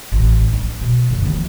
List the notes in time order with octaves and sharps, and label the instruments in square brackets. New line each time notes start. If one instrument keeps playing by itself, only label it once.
[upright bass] A1
D4
B2
F#2 D3
D#2 F3